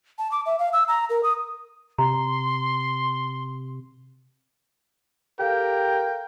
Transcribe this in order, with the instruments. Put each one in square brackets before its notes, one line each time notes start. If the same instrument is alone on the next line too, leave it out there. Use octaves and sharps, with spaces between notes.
[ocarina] A5
D6
E5
F5
E6
A#5
A#4
D#6
[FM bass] C3 [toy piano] A#5 [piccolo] C6
[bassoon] G4 [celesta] A4 F5 [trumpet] A#4 [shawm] G5